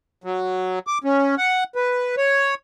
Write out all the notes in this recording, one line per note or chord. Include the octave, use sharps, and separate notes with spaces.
F#3
D6
C#4
F#5
B4
C#5